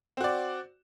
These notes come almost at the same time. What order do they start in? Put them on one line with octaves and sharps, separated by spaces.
C4 F#4 D5